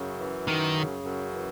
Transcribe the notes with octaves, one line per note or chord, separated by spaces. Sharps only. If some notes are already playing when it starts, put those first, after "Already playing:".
Already playing: F#2 C#3
E3
F#2 D#3
C#3
F#2
E3